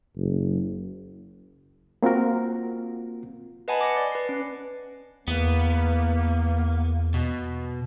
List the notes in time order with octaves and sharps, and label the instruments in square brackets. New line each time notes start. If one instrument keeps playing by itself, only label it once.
[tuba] F#1
[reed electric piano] A#3 C4 F4 F#4 A#4
[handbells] B4 D#5 F#5 G#5 A5 B5
D6 A#6 C#7
D5
B4 C7
C#4
[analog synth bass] E2 [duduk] A#3 [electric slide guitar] B3
[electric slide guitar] B2